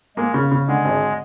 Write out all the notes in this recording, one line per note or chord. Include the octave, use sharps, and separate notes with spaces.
G#3 A#3
C#3
C#3
D3 G#3
G#1